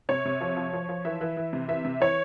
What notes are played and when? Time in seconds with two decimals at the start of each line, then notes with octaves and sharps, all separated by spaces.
0.09 C3 C#5
0.25 C3
0.41 F3
0.57 F3
0.73 F3
0.89 F3
1.05 E3 E5
1.21 E3
1.37 E3
1.53 C3
1.68 E3 E5
1.85 C3
2.00 E3 C#5